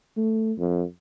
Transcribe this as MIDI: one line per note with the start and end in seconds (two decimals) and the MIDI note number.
0.17 0.52 57
0.58 0.83 41